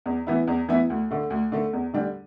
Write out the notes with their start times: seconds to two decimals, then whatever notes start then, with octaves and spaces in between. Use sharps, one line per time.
0.06 E2
0.27 E3 B3 E4
0.47 E2
0.68 E3 B3 E4
0.90 D2
1.11 D3 A3
1.30 D2
1.52 D3 A3
1.73 E2
1.94 D3 G3 D4